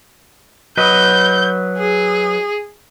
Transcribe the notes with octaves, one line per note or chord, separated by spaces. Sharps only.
F#3 B4 D#5 G6
G#4